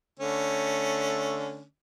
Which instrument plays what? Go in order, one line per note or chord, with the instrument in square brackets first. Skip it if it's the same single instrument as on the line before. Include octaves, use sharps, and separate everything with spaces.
[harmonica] D3 A3 C#4